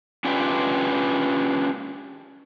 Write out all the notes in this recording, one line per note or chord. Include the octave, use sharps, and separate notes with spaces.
C#4 D4 F4 G4 B4